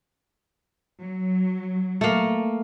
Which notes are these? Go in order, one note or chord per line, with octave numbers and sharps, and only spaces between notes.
F#3
A3 A#3